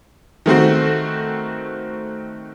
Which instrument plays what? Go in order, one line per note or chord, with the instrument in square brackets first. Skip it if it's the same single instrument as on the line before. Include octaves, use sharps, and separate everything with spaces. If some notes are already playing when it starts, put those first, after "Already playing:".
[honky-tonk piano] D#3 A3 C4 F#4